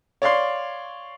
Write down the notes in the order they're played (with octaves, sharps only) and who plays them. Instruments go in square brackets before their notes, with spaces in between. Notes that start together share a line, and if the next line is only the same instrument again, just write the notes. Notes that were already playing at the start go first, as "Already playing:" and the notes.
[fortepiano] C#5 D5 F5 C6